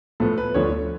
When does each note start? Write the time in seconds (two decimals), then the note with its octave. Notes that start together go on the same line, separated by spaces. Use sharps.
0.20 A2 F3 B3 A4
0.38 B4
0.54 D2 D3 F3 A3 C#5